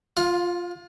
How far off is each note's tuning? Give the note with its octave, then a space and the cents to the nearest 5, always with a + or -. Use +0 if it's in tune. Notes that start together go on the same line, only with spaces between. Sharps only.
F4 +0 F5 +35